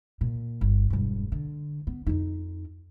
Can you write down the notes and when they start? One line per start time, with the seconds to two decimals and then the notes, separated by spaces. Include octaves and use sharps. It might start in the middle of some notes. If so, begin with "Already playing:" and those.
0.21 A#2
0.61 G1
0.90 E1 G2
1.32 D3
1.87 B3
2.07 F2 D#4